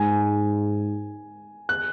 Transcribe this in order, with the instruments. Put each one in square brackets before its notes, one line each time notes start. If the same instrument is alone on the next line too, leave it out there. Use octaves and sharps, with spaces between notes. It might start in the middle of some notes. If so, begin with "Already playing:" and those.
Already playing: [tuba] G#2 [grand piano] G#5
[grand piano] F#6